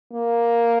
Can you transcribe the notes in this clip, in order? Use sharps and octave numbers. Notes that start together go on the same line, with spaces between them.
A#3